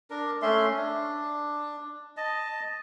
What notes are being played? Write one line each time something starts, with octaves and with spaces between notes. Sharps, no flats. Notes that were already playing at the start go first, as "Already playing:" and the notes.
D4 A#4
A3 C#4 E5 C6
D4
D#5 A5